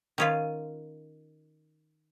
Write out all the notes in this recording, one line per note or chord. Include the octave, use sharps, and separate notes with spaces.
D#3 C#4 F4